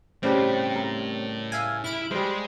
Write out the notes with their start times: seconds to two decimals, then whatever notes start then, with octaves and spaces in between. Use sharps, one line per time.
0.23 A2 C#3 G3 C4 D4 G4
0.76 A#4
1.52 E5 F5 G#5
1.84 E4 F6 D7
2.11 G3 G#3 C5